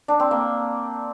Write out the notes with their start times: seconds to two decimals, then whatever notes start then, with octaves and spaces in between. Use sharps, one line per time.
0.08 D4
0.20 C4
0.31 A#3